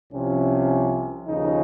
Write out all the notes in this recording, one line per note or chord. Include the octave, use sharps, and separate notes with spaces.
C2 C3 F3 C#4
D#2 C#3 F3 D#4